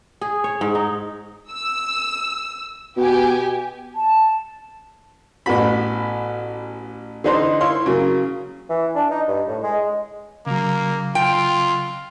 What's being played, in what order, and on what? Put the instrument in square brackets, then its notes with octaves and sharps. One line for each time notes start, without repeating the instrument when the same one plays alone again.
[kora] G#4
C#5
G#2
D#4
[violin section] E6
[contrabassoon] B2 [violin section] B3 G4 G#5
[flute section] A5
[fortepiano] A1 B3 F#4 B5
D3 E3 D#4 B4 C5
E4 C#5 F5 C6
C#3 F#3 A#3
[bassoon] E3
D4
D#4
G2
A2
G#3
[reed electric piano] C#3 F#3 [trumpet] A#3
[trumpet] F4 [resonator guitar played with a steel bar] G5